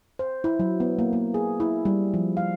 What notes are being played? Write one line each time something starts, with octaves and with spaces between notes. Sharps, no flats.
C5
E4
F#3
B3
A#3
A#3
G#4
E4
G3
F3
F5